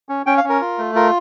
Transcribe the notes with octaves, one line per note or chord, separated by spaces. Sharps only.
C#4
C#4 G5
F5
C#4
A#4
F4
A3
F4 A#4